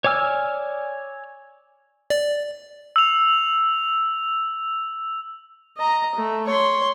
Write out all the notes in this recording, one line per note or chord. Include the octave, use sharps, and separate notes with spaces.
C#5 D5 G#5 E6 F6
D5
E6 F7
D#5 A#5
A3
C#5 C6